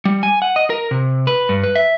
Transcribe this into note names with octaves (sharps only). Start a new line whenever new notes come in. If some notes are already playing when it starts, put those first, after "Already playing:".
G3
G#5
F#5
D#5
A#4
C3
B4
G2
B4
E5